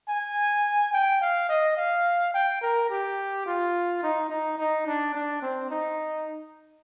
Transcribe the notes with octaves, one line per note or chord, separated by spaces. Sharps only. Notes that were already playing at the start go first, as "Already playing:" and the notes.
G#5
G5
F5
D#5
F5
G5
A#4
G4
F4
D#4
D#4
D#4
D4
D4
C4
D#4